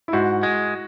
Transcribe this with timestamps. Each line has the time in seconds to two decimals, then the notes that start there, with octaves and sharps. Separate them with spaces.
0.08 E4
0.13 G#2 F#4
0.43 G#3